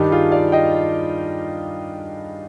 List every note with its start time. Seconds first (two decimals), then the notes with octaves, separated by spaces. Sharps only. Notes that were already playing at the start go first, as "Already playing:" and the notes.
Already playing: G2 D#3 G3 D4 D#4 G4
0.12 F4 G#4
0.32 D5 F5
0.52 D#5 G5